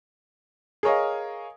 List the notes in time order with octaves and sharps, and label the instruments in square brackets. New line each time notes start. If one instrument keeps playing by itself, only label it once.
[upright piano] G#4 A#4 C#5 D#5 F5